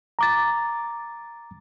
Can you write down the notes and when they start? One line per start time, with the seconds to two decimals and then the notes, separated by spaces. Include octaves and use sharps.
0.19 A#5 D6 A6